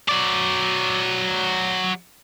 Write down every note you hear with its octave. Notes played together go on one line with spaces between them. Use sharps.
F#3 D5